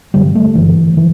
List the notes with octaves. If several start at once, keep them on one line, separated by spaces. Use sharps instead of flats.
G2 D3 G3
A3
G2 D3 E3
E3